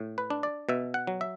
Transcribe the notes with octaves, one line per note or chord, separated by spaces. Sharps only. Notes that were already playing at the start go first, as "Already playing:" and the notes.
Already playing: A2
B4
D4
D5
B2 E5
F#5
F#3
E5